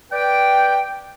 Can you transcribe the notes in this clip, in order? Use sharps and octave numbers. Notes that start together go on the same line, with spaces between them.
B4 D5 G5